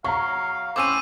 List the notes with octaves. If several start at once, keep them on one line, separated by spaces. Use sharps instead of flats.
F#3 F5 A#5 C#6
A2 C4 C#4 C5 D6 E6 D#7